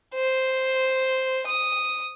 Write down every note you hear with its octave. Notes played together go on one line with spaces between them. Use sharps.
C5
D#6